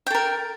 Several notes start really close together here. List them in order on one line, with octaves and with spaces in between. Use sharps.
G5 A4 A#4